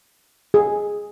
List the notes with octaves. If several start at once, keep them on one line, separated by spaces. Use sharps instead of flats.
G#4